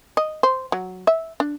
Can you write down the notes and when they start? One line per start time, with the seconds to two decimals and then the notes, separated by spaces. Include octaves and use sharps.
0.17 D#5
0.43 C5
0.72 F#3
1.07 E5
1.40 D4